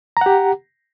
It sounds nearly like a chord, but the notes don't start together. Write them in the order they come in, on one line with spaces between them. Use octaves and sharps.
A#5 F#5 G4